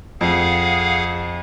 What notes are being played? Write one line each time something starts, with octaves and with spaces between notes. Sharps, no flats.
F2 G#4 F5 F#5